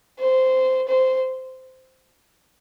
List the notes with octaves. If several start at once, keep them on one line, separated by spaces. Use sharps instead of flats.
C5
C5